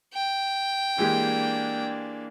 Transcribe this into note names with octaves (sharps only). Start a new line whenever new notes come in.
G5
E3 G#3 A#3 D4 G4